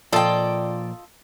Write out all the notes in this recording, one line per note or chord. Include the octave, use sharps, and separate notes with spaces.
A#2 F3 F4 A4 D5 D#5 G5